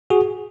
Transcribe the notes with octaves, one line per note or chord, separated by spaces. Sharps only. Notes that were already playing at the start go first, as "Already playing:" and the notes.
F#4 G#4